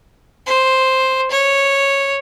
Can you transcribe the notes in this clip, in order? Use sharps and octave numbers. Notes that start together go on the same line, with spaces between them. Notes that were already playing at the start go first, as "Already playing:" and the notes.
C5
C#5